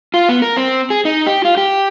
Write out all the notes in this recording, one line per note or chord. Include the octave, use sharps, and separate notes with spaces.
F4
B3
A#4
C4
G#4
D#4
G4
F4
G4